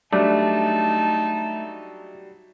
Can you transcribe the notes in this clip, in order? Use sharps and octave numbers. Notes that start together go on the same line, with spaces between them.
F#3 G3 A3 D4 D#4 A5